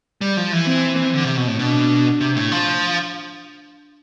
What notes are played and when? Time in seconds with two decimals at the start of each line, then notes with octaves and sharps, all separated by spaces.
0.21 G3
0.37 F3
0.52 E3
0.67 C4
1.14 D3
1.24 C3
1.37 B2
1.48 A2
1.59 B2 D4
2.21 C3
2.36 A2
2.52 F3